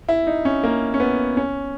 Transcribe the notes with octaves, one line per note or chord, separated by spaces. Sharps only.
E4
D#4
C#4
A#3
C#4
B3
C#4